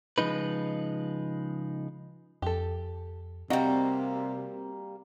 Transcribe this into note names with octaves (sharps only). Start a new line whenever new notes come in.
C#3 F3 G#3 D#4 B4
F2 G4 A4
C3 G3 A#3 C4 F#4 D#5 F#5